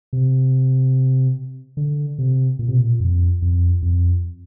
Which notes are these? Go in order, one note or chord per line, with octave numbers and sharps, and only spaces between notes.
C3
D3
C3
A#2
C3
A#2
F2
F2
F2